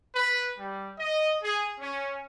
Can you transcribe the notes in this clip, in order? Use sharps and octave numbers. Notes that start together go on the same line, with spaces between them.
B4
G3
D#5
G#4
C#4